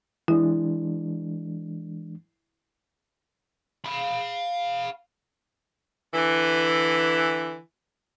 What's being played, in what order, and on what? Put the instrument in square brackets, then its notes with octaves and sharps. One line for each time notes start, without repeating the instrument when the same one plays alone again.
[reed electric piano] E3 G#3 D4 [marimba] E4
[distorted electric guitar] F5 B5
[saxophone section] D3 E3